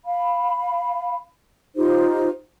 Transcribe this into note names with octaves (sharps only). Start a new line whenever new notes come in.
F5 B5
D#4 F4 G4 C5